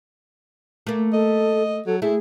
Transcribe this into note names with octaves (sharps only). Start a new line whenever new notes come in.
A3 A#3
A4 D#5
F#3 A4
A3 E4 G#4